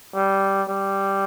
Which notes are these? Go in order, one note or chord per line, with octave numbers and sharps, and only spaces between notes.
G3
G3